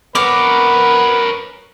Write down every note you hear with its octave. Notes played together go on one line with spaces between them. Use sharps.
B3 A#4 B4 C#5 D6